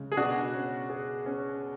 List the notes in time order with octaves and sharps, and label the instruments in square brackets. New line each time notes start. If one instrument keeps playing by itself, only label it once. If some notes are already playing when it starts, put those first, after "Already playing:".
Already playing: [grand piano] C#3 G#3
[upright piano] G#4
[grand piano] B2 [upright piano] D4 F#4
[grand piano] C#4
G#4
C#4